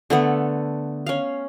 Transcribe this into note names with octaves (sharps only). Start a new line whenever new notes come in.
D3 A3 B3
C#4 F5